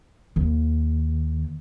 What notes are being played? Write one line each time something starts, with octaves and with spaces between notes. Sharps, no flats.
D#2